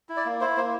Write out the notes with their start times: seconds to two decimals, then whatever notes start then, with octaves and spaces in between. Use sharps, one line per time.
0.09 E4
0.17 D5
0.25 A#3
0.41 E4 C5
0.57 A#3 C5